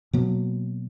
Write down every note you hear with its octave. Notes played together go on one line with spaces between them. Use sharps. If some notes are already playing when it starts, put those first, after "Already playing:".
B2 F#3 A#3